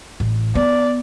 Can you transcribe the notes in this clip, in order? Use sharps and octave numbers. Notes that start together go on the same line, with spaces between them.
A1
B3 D5